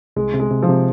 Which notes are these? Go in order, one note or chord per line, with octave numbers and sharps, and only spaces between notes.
C2 G#3
C3
G#3
C3
F3
C3